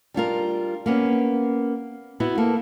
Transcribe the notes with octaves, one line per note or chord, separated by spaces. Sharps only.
G3 D4 F4 A#4
A#3 B3 C#4
B3 E4 F#4
A#3 A4